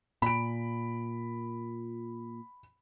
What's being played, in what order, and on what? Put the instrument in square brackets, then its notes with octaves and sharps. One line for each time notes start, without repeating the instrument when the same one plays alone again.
[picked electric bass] A#2 [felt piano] B5 D7